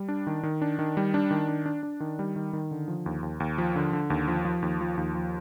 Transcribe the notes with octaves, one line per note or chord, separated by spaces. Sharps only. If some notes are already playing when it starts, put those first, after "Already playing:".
Already playing: G3
D4
D#3
D#3
D4
D#3
G3
D4
D#3
D4
D4
D4
D#3
G3
D#3
D#3
D3
F3
D#2
D#2
D#2
F3
D3
D3
D#2
F3
F3
D#2
F3
D#2
F3